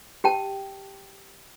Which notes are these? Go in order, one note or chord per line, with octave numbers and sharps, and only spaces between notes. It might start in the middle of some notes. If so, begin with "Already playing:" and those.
G4 G5 A5